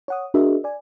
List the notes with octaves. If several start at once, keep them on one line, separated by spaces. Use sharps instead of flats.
C#5 F#5 D#6
D4 F#4 G#4 A#4 D#5 E5
D5 G#5